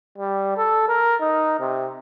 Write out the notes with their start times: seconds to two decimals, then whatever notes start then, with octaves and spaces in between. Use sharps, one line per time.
0.18 G3
0.57 A4
0.88 A#4
1.21 D#4
1.60 C3